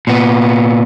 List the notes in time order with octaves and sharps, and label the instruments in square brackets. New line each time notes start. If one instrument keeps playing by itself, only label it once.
[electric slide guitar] A#2 B3